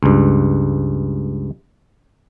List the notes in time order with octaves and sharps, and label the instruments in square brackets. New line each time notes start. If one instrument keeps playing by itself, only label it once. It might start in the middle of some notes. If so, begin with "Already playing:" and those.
[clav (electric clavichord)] C#2 G2